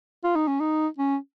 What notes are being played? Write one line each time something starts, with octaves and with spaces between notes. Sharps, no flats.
F4
D#4
C#4
D#4
C#4